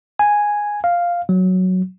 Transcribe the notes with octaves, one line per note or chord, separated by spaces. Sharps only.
G#5
F5
F#3